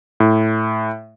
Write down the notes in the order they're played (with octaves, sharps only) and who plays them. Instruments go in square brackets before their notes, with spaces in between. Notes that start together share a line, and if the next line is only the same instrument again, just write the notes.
[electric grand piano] A2